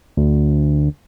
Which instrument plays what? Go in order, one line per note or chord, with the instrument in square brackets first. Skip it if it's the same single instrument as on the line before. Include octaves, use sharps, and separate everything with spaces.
[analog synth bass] D2